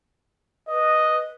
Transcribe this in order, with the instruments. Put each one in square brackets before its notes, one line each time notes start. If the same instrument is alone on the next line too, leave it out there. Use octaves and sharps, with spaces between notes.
[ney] B4 [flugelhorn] D#5